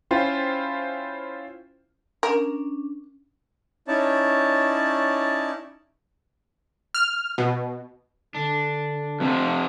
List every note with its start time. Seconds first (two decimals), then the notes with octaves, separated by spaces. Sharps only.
0.11 C#4 E4 F4 C5 G5
2.23 C#4 D4 A#4
3.88 C#4 D#4 E4 C#5 D5 A5
6.94 F6
7.38 B2
8.35 D3 D4
9.20 F2 C3 F3